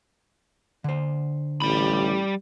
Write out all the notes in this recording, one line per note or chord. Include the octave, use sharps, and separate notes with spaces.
D3 C5
A1 G3 B5